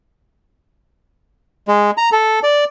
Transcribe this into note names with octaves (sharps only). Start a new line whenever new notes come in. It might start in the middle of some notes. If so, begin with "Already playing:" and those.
G#3
A#5
A4
D5